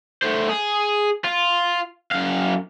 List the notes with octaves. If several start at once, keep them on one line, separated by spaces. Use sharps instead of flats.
A3 C5
G#4
F4
F#2 F5